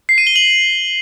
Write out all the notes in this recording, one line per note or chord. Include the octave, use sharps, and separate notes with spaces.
C7
D#7
G7
F#7